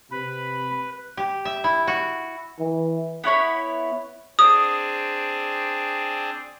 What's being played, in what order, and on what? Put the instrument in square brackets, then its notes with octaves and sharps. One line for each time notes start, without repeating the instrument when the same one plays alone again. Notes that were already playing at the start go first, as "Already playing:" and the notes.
[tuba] C3 [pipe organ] B4 [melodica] B5
[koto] G4
E5
E4
F#4
[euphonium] E3
[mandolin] B3 E4 C#5 B5
[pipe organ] C4 D4 G#4 [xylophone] D#6